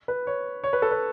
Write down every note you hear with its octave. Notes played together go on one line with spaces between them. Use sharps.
B4
C#5
C#5
B4
A4
B4